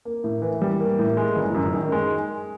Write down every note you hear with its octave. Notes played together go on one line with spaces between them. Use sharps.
A#3
A2
E3
G3
A#3
A2
G#3
G1
F#2
D#3
G#3